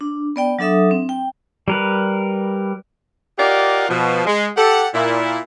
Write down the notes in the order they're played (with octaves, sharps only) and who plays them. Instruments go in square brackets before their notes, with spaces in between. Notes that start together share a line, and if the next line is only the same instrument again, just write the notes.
[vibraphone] D4
B3 D5 G5
F#3 D4 A4 E5 D#6
C4
G5
[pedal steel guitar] G3 A#4 B4
[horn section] F4 G4 A#4 D5 D#5 F#5
B2 F3
G#3
G4 A4 F#5
A#2 E4